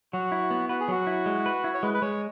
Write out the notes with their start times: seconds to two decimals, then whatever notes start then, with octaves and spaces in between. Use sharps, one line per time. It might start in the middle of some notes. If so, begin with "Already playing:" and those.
0.13 F#3 F#4
0.32 E4
0.51 B3
0.69 F#4 B4
0.80 G#4
0.88 F#3 F#4
1.07 E4
1.26 G#3
1.46 B4
1.64 E4
1.74 C#5
1.83 G#3 B4
1.94 B4
2.02 G#3 C#5